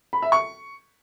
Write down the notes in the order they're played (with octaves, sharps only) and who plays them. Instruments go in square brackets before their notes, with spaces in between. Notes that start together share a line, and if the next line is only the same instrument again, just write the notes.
[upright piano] B5
E5
C#6